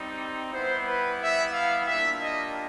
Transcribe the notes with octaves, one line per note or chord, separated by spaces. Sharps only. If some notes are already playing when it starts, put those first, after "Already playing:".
Already playing: G3 C4 D#4
G3 B3 E4 C5
B4
E5
F5
G3 A#3 D4 F4 E5
D#5